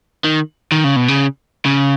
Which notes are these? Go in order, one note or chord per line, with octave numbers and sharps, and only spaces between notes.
D#3
D#3
C#3
B2
C#3
C#3